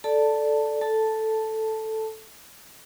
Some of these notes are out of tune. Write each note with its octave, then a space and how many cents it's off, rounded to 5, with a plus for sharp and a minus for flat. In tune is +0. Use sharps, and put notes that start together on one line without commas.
A4 -5 D5 +0 A5 +10
A4 +0 A5 +0